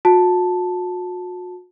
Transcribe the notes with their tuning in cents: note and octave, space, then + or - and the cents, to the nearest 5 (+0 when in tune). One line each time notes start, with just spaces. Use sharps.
F#4 -40 A5 +0